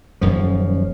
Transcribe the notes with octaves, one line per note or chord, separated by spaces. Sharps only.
D#1 F#2 F3